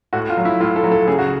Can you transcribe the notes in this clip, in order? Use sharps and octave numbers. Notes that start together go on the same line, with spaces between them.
A2 F#4
F4
F#3
E4
A2 F4
A4
F#3
A4
C#3 G#4
F#4